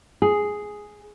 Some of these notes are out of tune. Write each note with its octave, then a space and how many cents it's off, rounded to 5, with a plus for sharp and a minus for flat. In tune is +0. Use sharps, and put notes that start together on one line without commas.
G#4 +0